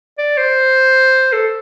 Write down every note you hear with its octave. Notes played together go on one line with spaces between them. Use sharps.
D5
C5
A4